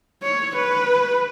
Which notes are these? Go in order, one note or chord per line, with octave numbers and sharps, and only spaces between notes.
C#5
B4